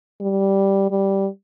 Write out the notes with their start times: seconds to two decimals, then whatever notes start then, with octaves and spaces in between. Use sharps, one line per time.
0.21 G3
0.91 G3